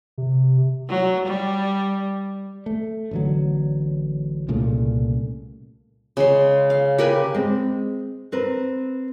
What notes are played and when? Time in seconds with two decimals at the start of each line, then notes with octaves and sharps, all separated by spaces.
0.18 C3
0.88 F#3
1.26 G3
2.66 A3
3.11 A1 D3 F#3
4.48 C2 A#2 C#3 A3
6.17 C#3 G#3 C6
6.70 F5
6.98 G4 A#4 B4 G#5
7.34 G#3 C4
8.32 C4 A#4 B4